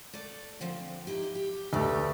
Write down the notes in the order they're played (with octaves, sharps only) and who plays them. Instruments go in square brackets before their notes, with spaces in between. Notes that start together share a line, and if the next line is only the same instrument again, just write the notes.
[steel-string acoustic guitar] A3 D5
D3 F3 C4
D#4 E4 G4
G4
[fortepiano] D2 A3 [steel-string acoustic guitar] G4 B4